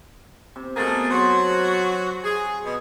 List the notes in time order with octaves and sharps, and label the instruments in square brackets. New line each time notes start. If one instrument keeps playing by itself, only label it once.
[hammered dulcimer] C3
[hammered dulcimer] B2 A5 A#5 [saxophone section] A3 A#3 G#4
[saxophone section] F#3 F#4 [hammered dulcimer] C5
[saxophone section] G#4
B2